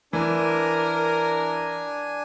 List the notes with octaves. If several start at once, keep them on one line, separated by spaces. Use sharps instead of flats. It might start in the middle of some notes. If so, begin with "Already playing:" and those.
E3 D4 A#4 G#5